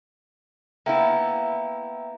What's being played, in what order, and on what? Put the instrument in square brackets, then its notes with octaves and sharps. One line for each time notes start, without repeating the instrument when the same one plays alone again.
[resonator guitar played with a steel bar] A#3 B3 E4 [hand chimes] E5 G5 A#5